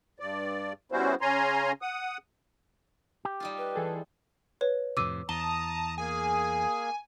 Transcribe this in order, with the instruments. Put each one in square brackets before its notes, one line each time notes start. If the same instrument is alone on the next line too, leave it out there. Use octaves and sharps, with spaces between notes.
[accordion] G2 D5
G3 B3 C#4 E4 F#4 C5
C#3 C#4 G#5 A#5 C6
F#5 D#6
[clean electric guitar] G4
[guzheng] G3 D#4 F4
[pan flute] B4
[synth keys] E3 G#4 A4
[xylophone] B4 C#5
[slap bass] F2 A2 C3 [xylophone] D6 E6 D#7
[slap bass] E2 [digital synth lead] A5 [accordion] A#5 D#6 [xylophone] G7
[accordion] A#3 G#4 [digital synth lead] G#5